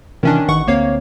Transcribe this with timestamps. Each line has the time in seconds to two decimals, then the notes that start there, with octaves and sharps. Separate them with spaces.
0.23 C3 D#3 E3 C#4 D4
0.48 A1 D#3 F#5 C#6
0.68 D2 A#3 C4 C#5 F5